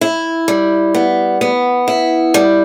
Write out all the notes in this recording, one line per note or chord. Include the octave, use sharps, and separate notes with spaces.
E4
G3
B3
B3
E4
G3